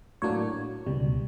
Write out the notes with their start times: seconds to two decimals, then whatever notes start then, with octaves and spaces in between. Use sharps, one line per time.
0.22 A2 F#3 A#3 D4 C#5
0.86 C#2 B2 G3